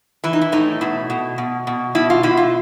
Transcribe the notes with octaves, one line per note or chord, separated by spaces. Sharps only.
E3 E4
D#4
E4
A2 D#4
B2 E4
B2
B2
B2
B2 E4
F4
B2 E4
F4